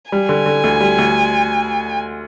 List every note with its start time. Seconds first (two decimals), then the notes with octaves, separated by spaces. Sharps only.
0.12 G3 G#5
0.29 D3
0.46 D3
0.64 D2
0.80 G3
0.98 D2